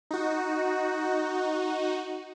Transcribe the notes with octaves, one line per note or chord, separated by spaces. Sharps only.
D#4 F#4